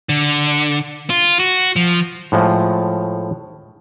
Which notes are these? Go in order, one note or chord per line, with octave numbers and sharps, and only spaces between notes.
D3
F4
F#4
F3
A2 F3 G#3 A3